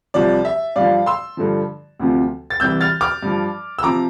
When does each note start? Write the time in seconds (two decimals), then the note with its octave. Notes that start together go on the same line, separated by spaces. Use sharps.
0.14 C2 C3 F3 D5
0.45 E5
0.76 G2 F3 D5 F5
1.06 C6 E6
1.37 G2 D3 F3
1.99 D2 C3 F3
2.50 A6
2.60 C2 C3 E3 E6 G6
2.81 F6 A6
3.01 D6 F6
3.23 G2 F3
3.79 E6
3.83 C3 F3 A#5 D6